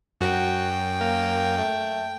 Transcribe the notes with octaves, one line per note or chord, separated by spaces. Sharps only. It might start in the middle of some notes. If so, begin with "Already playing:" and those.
F#2 F#4 G5
A#3
A3